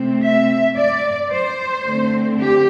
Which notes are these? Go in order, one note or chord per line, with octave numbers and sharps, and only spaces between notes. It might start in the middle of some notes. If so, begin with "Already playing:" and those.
Already playing: C3 A3 C4
E5
D5
C5
D3 A3 C4
G4